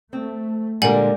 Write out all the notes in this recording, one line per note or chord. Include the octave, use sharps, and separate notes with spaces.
A3 C4
A#2 D3 G3 G#3 A#4 F#5 G#5 F#7